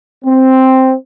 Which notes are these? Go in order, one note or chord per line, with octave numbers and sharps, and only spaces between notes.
C4